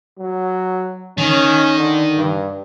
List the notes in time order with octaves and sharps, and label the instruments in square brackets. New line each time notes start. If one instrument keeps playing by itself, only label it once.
[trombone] F#3
[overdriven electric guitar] D#3 [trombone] C#4
[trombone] D3
G2